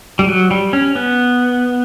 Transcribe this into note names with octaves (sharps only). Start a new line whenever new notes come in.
G3
F#3
G3
C#4
B3